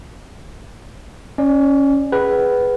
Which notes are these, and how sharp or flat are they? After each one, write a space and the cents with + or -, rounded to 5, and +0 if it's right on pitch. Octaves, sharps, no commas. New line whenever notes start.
C#4 -5 D5 +20
G#4 +0 B4 +0 F#5 +35